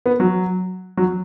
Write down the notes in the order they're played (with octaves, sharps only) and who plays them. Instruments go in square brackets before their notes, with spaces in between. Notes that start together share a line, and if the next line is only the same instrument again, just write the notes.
[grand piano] B3
F#3
F#3